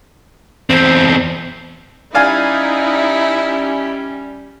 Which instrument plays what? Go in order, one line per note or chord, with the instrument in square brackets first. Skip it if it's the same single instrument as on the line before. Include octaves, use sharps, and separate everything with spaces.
[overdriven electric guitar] E2 C4 [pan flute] C5
[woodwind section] G3 C#4 [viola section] D#4 [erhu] E4 [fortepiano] D5 F5 G#5